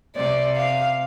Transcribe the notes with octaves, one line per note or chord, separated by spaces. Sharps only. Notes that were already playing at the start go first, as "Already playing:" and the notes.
C3 D5
F5